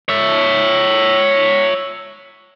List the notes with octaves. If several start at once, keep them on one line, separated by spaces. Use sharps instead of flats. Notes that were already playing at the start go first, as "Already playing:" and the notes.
C#5 E5